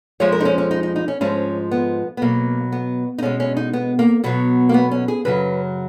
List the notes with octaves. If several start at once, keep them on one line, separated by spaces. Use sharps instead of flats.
F2 F3 G#3 C#5
A#4
D#4
C#4
C#4
D#4
D#4
D#4
C#4
G#2 F3 G#3 C#4
B3
B3
B2 F#3 A#3
B3
D#4
B2 G#3 C#4
C#4
D#4
B3
A#3
B2 F#3 B3
A#3
B3
C#4
G#4
F#2 C#3 F#3 B4